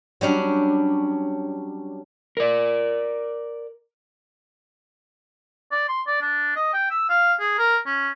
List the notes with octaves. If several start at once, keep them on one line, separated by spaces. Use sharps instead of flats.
F#3 G3 C#4 D4
A#4 D5
D5
C6
D5
D4
D#5
G5
E6
F5
G#4
A#4
C#4